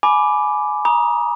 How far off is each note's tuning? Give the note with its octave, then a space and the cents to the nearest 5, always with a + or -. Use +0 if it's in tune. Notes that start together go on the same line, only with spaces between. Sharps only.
G#5 +20 B5 +0 D6 +0
A#5 +30 D#6 +0